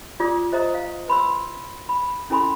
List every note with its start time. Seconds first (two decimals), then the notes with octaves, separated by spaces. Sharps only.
0.20 F4 D5 D6 D#6
0.52 C5 D#5 E5 A#5 D#6
0.74 F5
1.08 B4 B5 C6 E6
1.89 B5
2.30 C#4 E4 A4 G#5 B5 C6